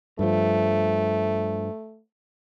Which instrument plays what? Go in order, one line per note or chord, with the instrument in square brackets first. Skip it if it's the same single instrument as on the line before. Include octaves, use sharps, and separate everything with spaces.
[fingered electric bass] G2 F3 [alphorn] A3